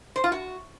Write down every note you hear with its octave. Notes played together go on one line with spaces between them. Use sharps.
C5
F4
F#4